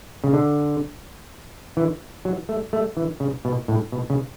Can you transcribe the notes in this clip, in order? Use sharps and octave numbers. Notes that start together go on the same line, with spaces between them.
C#3
D3
E3
F#3
A3
A3
E3
C#3
B2
A2
B2
C#3